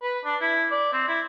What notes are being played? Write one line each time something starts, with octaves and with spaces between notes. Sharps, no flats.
B4
D4
E4
D5
C4
E4